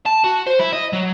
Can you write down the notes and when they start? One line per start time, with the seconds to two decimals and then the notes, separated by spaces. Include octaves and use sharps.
0.06 A5
0.24 F#4
0.47 C5
0.59 E4
0.73 D#5
0.93 F#3